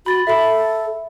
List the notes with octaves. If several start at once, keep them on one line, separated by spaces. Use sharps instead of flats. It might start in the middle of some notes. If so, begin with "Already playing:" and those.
F#4 B5 A6
A4 E5 B5